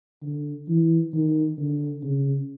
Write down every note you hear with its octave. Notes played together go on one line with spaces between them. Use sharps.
D3
E3
D#3
D3
C#3